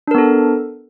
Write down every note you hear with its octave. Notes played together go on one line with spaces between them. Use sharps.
B3 D4 A4 A#4